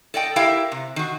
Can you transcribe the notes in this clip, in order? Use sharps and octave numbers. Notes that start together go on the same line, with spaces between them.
A4 D5 D#5 G5
E4 G4 A#4 E5 F5 G5
C3
D#3 F#4